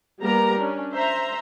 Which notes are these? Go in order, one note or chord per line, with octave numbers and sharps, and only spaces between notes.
G3 A#3 B3 A#4 A#5
C#4 D4
C5 E5 A#5